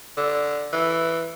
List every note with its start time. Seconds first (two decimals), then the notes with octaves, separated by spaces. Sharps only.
0.17 D3
0.73 E3